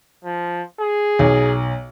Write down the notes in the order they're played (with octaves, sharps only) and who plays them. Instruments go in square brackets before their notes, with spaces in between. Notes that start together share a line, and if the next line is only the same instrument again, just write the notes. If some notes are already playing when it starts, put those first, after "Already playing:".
[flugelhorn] F3
G#4
[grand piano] B1